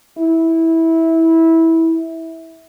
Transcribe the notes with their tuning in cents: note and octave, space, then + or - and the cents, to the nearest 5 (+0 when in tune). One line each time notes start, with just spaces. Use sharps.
E4 -15